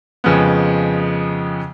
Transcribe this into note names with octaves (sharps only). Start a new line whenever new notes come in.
F2 C#3 F3 G#3 B3